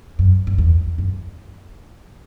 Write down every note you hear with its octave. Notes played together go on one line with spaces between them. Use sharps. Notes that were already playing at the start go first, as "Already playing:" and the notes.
F#2
F#2
E2
F#2